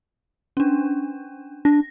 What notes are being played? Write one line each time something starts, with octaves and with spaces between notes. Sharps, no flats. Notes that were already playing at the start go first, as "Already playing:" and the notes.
C#4 D4
D4 A#6